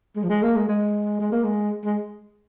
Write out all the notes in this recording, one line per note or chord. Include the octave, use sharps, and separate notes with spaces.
G#3
F3
G#3
A#3
G#3
G#3
G#3
A#3
G#3
G#3